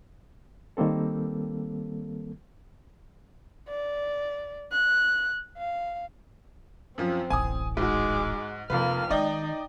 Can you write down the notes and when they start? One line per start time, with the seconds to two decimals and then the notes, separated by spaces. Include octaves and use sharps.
0.77 D#3 G3 A#3 C4 A4
3.69 D5
4.72 F#6
5.58 F5
6.98 F#2 F3 C4
7.30 D1 A1 G#5 D#6
7.77 G#2 G#3 F#4 D6
8.70 F1 C3 A#3 F4 B4 F6
9.11 D#3 G#3 D#4 D5 D#5 G5